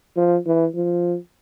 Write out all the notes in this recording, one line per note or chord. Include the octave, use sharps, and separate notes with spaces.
F3
E3
F3